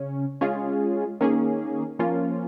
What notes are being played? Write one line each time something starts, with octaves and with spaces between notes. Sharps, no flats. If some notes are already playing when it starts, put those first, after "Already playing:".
Already playing: C#3 C#4
G#3 C#4 F4 G#4
D#3 A#3 C#4 G#4
F3 A#3 C#4 F4